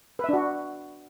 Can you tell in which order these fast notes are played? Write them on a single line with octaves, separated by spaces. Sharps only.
B4 E5 D4 F#4